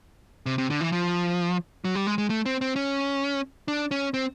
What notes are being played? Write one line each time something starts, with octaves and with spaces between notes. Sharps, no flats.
C3
C3
D3
E3
F3
F#3
G3
G#3
G#3
A3
C4
C4
C#4
D4
C#4
C4